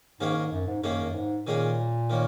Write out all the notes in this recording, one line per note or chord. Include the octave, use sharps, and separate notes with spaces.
G#2 D#3 A#3 C#4 G#4
G#2
F#2
G#2
F#2 D#3 A#3 C#4 G#4
F#2
G#2
A#2 D#3 A#3 C#4 G#4
D#3 A#3 C#4